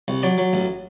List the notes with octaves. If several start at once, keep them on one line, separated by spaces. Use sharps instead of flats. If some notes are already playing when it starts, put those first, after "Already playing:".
C2
F#3 D5
F#3
A1